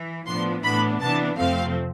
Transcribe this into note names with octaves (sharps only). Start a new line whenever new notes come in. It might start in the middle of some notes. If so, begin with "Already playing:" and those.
Already playing: E3
A2 F3 B3 D4 C6
A2 E3 B3 D4 B5
C3 E3 B3 D4 A5
F2 C3 F3 A3 C4 F5